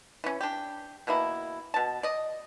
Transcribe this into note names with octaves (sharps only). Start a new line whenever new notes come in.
E3 C#4
D4 G4
B2 E3 A#3 E4
B2 A5
D5 D#5